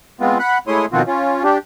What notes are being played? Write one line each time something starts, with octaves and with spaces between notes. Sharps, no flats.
G#3 B3 C4 F4
F#5 B5 F#6
G#3 A3 E4 C#5 C6 D#6
B2 D#3 F3 C4 F4 F#4
C#4 F4
D4 G4